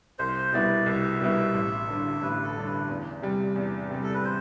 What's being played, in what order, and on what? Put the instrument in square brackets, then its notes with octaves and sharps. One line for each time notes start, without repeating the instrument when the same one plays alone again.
[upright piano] C2 [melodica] C5
[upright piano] B2 G3 B3 E4 [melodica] D5
[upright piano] C2 [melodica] E5
[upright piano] B2 G3 B3 E4
A1
G2 D3
[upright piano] A1 [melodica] B4
[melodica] A4
[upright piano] G2 D3
[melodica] B4
[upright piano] E2
C3 G3
E2
C3 G3
[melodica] A4
B4
C5